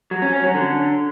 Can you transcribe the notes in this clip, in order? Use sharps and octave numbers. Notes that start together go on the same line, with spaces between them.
F#3
C#4
C#4
F#3
D3